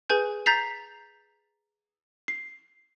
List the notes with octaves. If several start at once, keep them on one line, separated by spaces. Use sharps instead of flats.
G#4 B4 G#5 G6
A#5 G6 A6 B6 C7 F7
C7